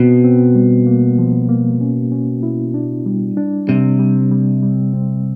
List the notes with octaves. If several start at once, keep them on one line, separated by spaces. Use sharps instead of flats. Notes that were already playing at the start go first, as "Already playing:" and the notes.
Already playing: B2 C4
C4
G3
A#3
F3
A#3
C#4
C#4
E4
D4
G3
D4
C3 G3
G3
G3
G3
C4